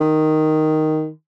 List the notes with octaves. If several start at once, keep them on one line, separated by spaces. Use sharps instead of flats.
D#3